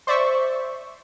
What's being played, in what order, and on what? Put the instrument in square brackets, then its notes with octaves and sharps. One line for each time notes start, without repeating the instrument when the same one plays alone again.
[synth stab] C5 D5 E5 C#6